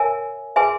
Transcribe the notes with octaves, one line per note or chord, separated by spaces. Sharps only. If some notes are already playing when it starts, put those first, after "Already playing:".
Already playing: A#4 C#5 E5 G#5
G#4 B4 E5 G#5 C6